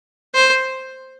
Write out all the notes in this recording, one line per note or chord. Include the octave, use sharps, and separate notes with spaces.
C5